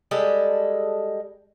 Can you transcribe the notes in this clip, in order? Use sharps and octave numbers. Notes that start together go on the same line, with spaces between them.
G3 G#3 A4